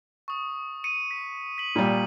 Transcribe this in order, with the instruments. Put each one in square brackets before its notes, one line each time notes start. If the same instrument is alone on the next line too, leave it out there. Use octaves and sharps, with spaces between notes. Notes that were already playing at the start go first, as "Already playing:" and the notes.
[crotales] C#6 D#6
C#7 D#7
B6
B6 F#7
[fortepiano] A#2 G3